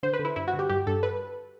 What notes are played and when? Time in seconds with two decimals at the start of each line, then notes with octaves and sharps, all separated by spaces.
0.03 D3 C5
0.13 B4
0.19 D3
0.25 E4
0.36 G2 E4
0.48 F#4
0.54 D3
0.59 G4
0.69 G2 G4
0.87 G2 A4
1.03 B4